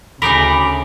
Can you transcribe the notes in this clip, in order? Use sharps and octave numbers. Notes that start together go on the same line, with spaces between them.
D2 C#3 D#4 A#4 B5 D6